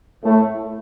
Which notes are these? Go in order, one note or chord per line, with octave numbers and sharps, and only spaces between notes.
A2 A3